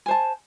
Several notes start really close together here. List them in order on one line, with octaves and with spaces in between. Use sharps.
G#5 C5 A5